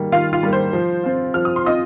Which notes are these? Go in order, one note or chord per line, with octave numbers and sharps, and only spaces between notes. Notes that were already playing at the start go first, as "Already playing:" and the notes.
Already playing: D#3 G3 A#3
D#3 F4 F5
F4 F5
G3 A#3
C5
F3
C4 F4
F3 F6
D#6
C6
C4 F4 D#5 D#6